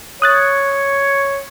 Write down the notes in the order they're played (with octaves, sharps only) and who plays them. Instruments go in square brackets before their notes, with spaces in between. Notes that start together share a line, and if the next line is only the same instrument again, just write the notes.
[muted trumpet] C#5 [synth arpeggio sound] D#6 F#6 A6